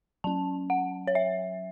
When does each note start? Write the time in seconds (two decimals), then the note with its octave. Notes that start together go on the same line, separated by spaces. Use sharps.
0.24 F#3 C#4 A5
0.70 F#5
1.07 C#5
1.15 E5